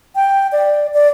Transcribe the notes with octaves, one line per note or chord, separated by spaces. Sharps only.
G5
D5
D5